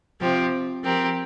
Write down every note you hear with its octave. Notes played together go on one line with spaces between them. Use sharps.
C3 F3 C4 G4
F3 C4 G4 A#4